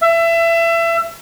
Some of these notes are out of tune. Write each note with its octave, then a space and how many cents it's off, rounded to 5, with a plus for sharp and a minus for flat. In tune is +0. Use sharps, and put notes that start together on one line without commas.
E5 +25